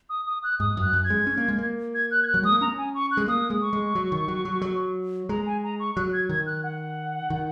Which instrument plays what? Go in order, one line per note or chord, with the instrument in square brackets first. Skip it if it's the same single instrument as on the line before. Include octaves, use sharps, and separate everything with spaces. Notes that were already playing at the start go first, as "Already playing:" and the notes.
[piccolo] D#6
D#6
F#6
[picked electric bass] G#2 [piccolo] D#6
[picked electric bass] F#2 [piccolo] F#6
[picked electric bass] F#2
[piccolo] G#6
[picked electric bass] G#3
C#4
A#3
G#3
A#3
[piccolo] G#6
F#6
G#6
F#6
[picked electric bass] F#3
[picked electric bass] G#3 [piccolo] D#6
[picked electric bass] A#3
[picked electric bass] C#4 [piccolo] A#5
[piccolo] G#5
C#6
F#6
[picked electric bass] G#3
[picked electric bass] A#3 [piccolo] D#6
[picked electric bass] G#3
[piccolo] C#6
[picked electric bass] G#3
F#3
D#3
F#3
F#3
F#3
[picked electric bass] G#3 [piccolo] A#5
[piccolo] G#5
A#5
C#6
[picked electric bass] F#3 [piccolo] F#6
[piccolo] G#6
[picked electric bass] D#3 [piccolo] G#6
[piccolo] F#6
F#5
[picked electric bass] D#3